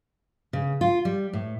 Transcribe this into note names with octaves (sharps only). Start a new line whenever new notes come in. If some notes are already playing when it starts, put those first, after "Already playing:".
C#3
F4
G3
A2